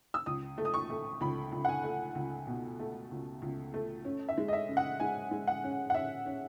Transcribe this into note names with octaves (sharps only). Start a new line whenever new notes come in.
E6
C#2 D#6
A3
D#6
C#6
A3
C#2 B5
C#2
F#5
G#5
A3
C#2
B2
A3
C#2
C#2
A3
C#4
E5
G#3
D#5
E5
C#3
F#5
G#3 G#5
G#3
F#5
C#4
F#5
C#4 E5
C#4